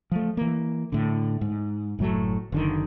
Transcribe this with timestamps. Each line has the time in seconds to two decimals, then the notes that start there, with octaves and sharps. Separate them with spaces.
0.12 F3 A3
0.37 E3 A#3
0.92 A2 D3
1.41 G#2
1.99 F#1 A2 F#3 A3
2.52 F#1 D3 D#3